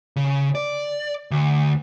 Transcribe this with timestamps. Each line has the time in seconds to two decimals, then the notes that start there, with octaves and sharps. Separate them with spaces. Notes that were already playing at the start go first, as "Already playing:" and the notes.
0.16 C#3
0.55 D5
1.31 D2